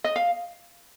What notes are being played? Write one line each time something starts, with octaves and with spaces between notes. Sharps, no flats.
D#5
F5